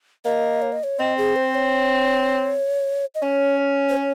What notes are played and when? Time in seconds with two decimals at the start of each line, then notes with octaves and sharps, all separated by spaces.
0.25 A#3 D#5
0.62 C#5
0.72 D#5
0.84 C#5
0.99 C4 D#5
1.18 G#4
1.36 C5
1.55 C#5
3.15 D#5
3.22 C#4 C#5
3.89 C5
3.97 C#5